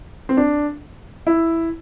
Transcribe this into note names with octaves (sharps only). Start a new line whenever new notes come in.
C4
D4
E4